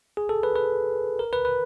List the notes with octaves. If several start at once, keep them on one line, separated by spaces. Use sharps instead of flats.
G#4
A4
B4
B4
A#4
B4
B4